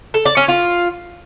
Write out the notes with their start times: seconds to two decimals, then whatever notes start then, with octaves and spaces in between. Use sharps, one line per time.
0.14 A4
0.25 D5
0.37 C#4
0.48 F4